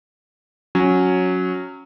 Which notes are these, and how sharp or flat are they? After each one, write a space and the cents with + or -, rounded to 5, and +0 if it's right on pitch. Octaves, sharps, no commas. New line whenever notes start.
F#3 -10 C#4 +0